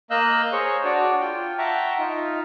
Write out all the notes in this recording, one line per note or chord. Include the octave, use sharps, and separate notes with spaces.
A#3 D#5 F5 E6 F#6 G6
G#4 C5 C#5 C#6
D4 F#4 C#5 D5
F4 G5
E5 F#5 G5 A5 A#5 C#6
D#4 F4